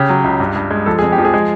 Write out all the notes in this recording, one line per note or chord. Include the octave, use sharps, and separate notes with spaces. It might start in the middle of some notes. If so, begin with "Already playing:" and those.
Already playing: C#3 G4
F#3
C#2
G2
G2
G#3
F3 A4
F2 G#4
G4
F3
G#4
G#3